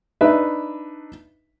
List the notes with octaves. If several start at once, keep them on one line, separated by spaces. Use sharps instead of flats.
D4 D#4 B4 E5